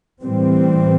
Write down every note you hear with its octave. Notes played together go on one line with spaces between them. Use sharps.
A2 E3 G3 C4